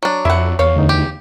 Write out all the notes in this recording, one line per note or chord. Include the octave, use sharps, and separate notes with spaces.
F#3 D4
F2 E4 E5 F#5
E2 C#5 F5
D2 D#4
G4